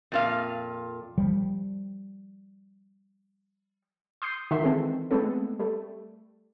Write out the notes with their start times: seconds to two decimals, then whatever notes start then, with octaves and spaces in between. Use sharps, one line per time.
0.12 F2 A#2 F5
1.18 F3 G3
4.22 C6 D#6 G6 C7
4.51 D#3 D#4 F#4 E5 C6
4.63 E3 G#3 C4 A4
5.11 G#3 A3 B3 C4 A4
5.59 G3 A3